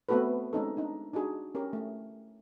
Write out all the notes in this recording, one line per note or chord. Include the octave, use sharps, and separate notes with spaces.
A3 B3 C4 F#4 A4 B4
G#3 C4 C#4 D#4 A4
D4 D#4
D4 D#4 F#4 G#4
C#4 G4 A#4
A3